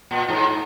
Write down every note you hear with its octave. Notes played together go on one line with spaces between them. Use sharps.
A#2
G#2